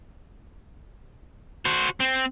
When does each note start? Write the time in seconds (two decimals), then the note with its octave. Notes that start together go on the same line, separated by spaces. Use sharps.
1.66 F#4 C5
2.00 C4